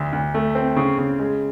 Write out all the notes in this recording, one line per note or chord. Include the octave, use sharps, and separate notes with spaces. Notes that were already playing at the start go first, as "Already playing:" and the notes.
Already playing: D2
D2
A3
C4
C#3
C#3
G#3